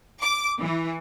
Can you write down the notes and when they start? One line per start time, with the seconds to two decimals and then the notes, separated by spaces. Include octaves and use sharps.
0.21 D6
0.60 E3